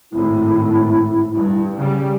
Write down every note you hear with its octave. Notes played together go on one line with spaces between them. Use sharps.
G#1 A2 E4
G2
C#3 G3